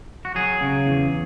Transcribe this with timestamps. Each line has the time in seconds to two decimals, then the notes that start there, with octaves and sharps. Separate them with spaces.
0.25 F#4
0.35 F#3 G#4
0.61 C#3
0.86 E2